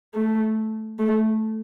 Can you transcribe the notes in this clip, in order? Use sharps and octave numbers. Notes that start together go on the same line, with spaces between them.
A3
A3